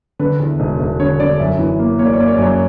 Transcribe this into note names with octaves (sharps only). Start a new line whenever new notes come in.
D3 B4
E2
E1
E1
D3 C#5
D3 D5
F#2 E5
E3
A#3
A#3 C#5
D5
C#5
A#3 D5
C#5
D5
F#2 C#5